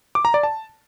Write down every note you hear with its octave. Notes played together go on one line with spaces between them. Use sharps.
D6
A#5
D5
A5